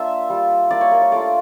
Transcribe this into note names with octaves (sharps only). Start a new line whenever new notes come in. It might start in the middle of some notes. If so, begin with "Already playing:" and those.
Already playing: A#3 D4 F4 E5
G3 D4 F4
A#3 E4 D5
C#5
A#4
C#5
A3 D4 F4 D5